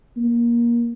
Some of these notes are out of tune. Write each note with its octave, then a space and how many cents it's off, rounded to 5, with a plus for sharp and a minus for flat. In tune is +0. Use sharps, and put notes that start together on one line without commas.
A#3 +20